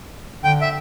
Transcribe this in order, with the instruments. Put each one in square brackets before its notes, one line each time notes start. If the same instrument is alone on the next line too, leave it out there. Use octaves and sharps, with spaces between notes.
[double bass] D3 [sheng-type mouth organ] G5
[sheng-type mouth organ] E5